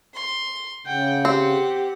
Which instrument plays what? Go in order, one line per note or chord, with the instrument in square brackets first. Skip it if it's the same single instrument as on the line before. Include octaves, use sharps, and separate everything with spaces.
[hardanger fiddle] C6
[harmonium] C#3 [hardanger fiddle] F#5 [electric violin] G5
[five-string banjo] C4 [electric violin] G4